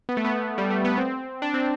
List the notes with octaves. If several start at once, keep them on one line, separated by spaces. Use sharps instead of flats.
B3
A3
B3
G3
A3
B3
C4
D4
C4